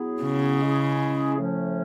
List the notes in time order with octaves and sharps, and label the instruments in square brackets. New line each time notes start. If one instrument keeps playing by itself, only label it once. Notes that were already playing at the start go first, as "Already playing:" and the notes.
Already playing: [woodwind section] F#3 B3 E4 G#4
[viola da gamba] C#3
[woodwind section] G#3 C#4 E4 G#4
A2 F3 A3 C#4